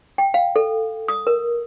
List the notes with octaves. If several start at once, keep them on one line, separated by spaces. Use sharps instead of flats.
G5
F5
A4
D#6
A#4